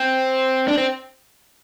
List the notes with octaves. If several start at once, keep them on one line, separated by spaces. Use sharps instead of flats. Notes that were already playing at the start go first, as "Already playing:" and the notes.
Already playing: C4
D4
C4